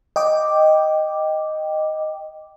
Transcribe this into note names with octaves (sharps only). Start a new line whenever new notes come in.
D#5 G5 D6